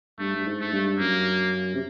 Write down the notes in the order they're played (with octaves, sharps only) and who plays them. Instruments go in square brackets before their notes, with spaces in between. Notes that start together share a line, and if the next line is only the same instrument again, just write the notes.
[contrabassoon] G2 [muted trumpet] A3
[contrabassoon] G2
G#2
[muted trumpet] A3
[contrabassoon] G2
[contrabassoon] F#2 [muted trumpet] A#3
[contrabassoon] C3